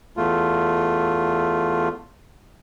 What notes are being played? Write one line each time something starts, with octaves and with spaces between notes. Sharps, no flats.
E2 A3 F4